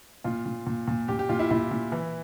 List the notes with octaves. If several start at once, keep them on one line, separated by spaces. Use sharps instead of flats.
A#2 F4
A#2
A#2
A#2
A#2 G4
G4
A#2 F4
E4
A#2 E4
A#2
E3